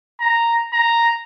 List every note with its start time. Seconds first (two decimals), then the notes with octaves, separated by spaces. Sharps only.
0.21 A#5
0.73 A#5